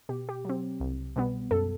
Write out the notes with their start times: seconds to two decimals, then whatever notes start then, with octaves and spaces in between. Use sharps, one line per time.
0.09 B2 G4
0.29 G4
0.45 F#3 C4
0.80 C2
1.16 B2 G3 B3
1.51 F#2 A4